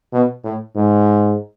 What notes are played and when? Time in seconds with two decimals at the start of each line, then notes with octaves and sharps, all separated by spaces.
0.12 B2
0.44 A2
0.76 G#2